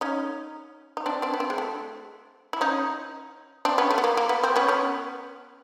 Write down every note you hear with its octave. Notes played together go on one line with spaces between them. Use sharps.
C#4 D#4
D#4
C4 D4
C4 D4
B3
C4
G#3
A3
E4
C#4 D#4
C4 D4
B3 C#4
A3
B3
A#3
A#3
B3
C4
B3 C#4
B3 C#4